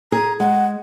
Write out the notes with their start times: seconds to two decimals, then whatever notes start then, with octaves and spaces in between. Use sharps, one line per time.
0.12 G#4 A#5
0.40 G#3 F#5